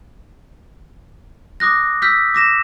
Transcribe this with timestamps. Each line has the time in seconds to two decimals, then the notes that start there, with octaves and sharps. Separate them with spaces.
1.60 D6 D#6 F#6 A#6
2.02 E6 F6 G6 B6
2.34 D6 A#6 E7